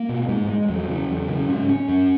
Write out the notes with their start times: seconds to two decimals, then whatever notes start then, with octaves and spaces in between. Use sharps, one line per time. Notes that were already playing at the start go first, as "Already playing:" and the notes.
Already playing: A#3
0.09 B2
0.28 G#2 G#3
0.49 G#3
0.68 E2 F#3
0.88 C#3
1.09 E2
1.29 C#3
1.48 G#2 C#4
1.69 C#4
1.88 F#2